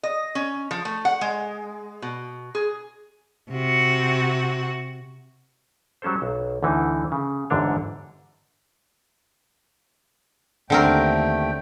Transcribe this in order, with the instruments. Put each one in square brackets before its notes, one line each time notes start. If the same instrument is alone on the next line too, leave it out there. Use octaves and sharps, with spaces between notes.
[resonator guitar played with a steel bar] D#5
C#4
F3
A3
F#5
G#3
B2
G#4
[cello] C3 F#4
[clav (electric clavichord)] F#3 G3 C#4 A4 C5
B1
D2 D3 E3 D#4
C#3
G1 E2 G#2 D3 D4 C#5
[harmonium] D#2 A3 G5 [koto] D3 C4 A#4